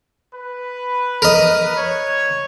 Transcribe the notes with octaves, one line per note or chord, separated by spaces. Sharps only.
B4
A#4 D#5
C#5